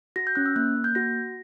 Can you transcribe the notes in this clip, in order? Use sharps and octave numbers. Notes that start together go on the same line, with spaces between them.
F#4 A#6
G6
C#4 F#6
E6
A#3 F#6
A#3
G6
F#4 A#6